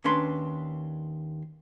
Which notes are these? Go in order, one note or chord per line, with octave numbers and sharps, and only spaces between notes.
D#2 C#4 D4 B4 C6